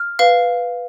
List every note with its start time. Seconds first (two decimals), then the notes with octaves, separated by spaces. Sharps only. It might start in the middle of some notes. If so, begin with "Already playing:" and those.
Already playing: F6
0.19 B4 F5